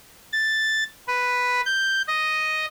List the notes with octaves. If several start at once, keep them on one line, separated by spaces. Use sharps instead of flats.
A6
B4
G6
D#5